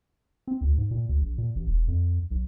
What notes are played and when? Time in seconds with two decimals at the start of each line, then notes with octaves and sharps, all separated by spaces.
0.47 C4
0.61 D2
0.78 G#2
0.91 A#2
1.09 D2
1.21 A#1
1.38 A#2
1.55 A1
1.67 E1
1.88 F2
2.31 B1